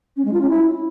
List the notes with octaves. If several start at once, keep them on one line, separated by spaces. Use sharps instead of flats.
C#4
G#3
F4
C#4
E4